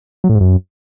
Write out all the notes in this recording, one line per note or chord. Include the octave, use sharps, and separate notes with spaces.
F#3
A2
G#2
F#2